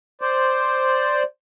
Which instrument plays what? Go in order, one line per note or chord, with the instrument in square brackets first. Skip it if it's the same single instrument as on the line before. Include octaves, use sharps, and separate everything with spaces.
[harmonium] C5 D5